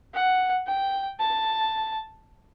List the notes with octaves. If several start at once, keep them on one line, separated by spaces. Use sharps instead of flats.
F#5
G5
A5